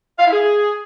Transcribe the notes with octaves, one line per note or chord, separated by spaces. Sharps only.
F5
E4
G#4